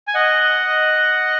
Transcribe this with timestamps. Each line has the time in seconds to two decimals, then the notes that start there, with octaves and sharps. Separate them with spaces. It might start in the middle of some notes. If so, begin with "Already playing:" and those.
0.07 G#5
0.14 D#5 F#5